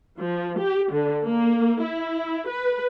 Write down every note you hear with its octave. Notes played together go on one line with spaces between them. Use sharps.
F3
G4
D3
A#3
E4
B4